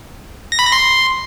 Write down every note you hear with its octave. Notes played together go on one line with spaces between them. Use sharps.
A#6
B5
A#6
C6